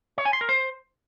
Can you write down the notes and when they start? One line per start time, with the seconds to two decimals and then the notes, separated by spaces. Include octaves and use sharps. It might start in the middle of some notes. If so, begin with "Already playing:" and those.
0.18 C#5
0.25 G#5
0.33 C6
0.41 A#4
0.49 C5